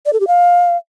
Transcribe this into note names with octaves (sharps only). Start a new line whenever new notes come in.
D5
A4
G4
F5